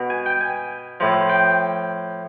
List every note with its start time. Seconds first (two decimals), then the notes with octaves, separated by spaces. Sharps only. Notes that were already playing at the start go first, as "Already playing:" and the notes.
Already playing: B2
0.10 G#5
0.26 G5
0.41 G#5
1.00 A2 F3
1.29 G5